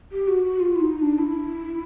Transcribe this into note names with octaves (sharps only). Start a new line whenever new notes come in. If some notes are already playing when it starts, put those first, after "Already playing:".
G4
F#4
F#4
F4
E4
D#4
D#4
D4
E4